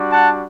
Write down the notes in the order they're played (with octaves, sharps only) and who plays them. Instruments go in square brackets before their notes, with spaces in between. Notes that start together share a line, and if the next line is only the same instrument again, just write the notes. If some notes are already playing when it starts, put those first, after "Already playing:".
Already playing: [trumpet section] G3 D4 F#4
F#5 A5